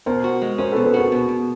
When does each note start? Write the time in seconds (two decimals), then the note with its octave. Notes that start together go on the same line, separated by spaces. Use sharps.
0.06 B2 A#4 C5
0.24 F#4
0.42 G#3
0.58 C#4 A#4 C5
0.72 B2 A4 B4
0.85 A4 B4
0.94 F#4 G#4 A#4
1.12 B2
1.28 B2